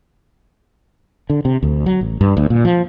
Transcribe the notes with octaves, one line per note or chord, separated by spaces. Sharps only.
D3
C3
D2
F#3
A1
G2
D2
A#2
F3